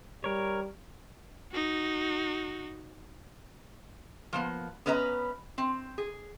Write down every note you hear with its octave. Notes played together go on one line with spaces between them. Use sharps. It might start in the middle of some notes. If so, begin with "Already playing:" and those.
G3 A#4 C#5
D#4 F#4
F3 A#3 B3
B3 C#4 B4 D#5 A#5
C4
G#4